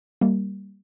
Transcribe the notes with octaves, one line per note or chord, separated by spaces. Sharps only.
G3 A#3